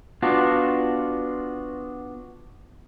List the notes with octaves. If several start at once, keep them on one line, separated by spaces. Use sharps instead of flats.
B3 D4 F4 F#4